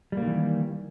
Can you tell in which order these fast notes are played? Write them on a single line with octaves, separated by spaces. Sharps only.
G3 A#3 D#3 E3